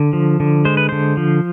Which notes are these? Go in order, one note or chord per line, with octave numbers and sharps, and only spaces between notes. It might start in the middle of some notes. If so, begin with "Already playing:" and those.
Already playing: D3
F3
D3
G#3 C5
B4
D3 C5
F3